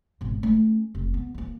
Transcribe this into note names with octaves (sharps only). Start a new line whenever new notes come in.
G#1 B2
A3 C#4
F1
B3
E3 A#3